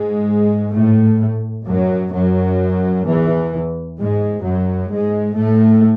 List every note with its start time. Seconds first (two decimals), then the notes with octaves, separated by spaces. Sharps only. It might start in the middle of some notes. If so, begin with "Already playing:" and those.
Already playing: G#2 G#3
0.76 A2 A3
1.68 F#2 F#3
2.14 F#2 F#3
3.06 E2 E3
3.99 G#2 G#3
4.45 F#2 F#3
4.91 G#2 G#3
5.38 A2 A3